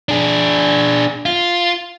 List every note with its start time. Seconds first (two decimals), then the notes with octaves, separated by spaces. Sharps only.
0.09 D4 G#4
1.26 F4